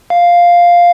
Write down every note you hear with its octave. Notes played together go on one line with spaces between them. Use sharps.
F5